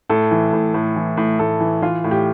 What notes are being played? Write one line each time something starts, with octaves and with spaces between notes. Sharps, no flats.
A2 A4
E3
A2
A2
E3
A2
A2 A4
E3
E3 F4
A2
G4